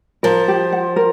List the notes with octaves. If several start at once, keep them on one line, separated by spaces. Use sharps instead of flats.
F3 A#4
G4
F#5
A#4